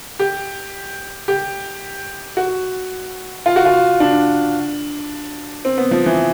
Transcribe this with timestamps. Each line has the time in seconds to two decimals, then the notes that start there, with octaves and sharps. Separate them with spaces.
0.19 G4
1.28 G4
2.37 F#4
3.46 F4
3.56 F#4
3.65 F4
4.00 D4
5.65 C4
5.78 B3
5.91 F3
6.06 E3